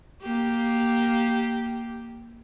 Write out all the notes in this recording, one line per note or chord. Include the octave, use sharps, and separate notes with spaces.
A#3 G4